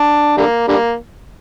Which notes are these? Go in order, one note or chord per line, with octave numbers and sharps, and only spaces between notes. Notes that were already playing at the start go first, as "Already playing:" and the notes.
Already playing: D4
D3 G3 A#3
D3 G3 A#3